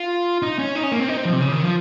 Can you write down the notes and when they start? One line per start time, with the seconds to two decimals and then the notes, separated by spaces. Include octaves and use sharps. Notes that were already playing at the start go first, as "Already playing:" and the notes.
Already playing: F4
0.42 D#4
0.59 C#4
0.75 D#4
0.83 C#4
0.92 A#3
1.00 C4
1.08 D#4
1.17 C4
1.25 F3
1.33 C3
1.41 C#3
1.52 D#3
1.63 F3